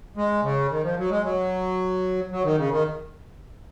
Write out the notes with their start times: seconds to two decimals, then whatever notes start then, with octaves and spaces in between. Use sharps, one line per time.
0.17 G#3
0.43 C#3
0.70 D#3
0.83 F3
0.98 F#3
1.10 G#3
1.24 F#3
2.31 F#3
2.44 D#3
2.58 C#3
2.71 D#3